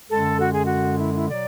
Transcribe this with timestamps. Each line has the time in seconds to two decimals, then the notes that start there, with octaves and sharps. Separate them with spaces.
0.10 F#2 D3 G#3 A4
0.40 F#4
0.53 G#4
0.65 F#4
1.00 E4
1.15 E4
1.30 B2 F#3 D5